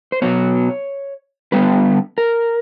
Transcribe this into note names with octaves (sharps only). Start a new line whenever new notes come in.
C5
B2 F#3 B3 C#5
D3 G3 B3 B4
A#4